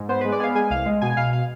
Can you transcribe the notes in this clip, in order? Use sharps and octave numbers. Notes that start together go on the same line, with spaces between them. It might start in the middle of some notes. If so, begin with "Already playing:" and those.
Already playing: G#2
B3 C5
G#3 B4
D5
B3 F5 G#5
G#3 G#5
C2 F5
G#3
B2 G#5
B2 F5
F5